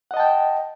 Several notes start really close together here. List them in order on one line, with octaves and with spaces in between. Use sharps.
F#5 D#5 A5 G5